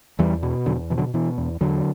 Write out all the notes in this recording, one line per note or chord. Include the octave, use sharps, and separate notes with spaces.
E2 E3 G3
B2
E2 D3 F#3
B2 E3
D3 F#3
B2 E3
E2
E2 D3 F#3